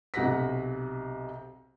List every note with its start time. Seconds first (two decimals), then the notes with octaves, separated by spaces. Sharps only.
0.14 B1 C3 F#5 A#6 B6